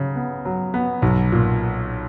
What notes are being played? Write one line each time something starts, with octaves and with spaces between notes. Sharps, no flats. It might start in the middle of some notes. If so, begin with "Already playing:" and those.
Already playing: C#3 F#3
B3
F#3
B3
B1
A#2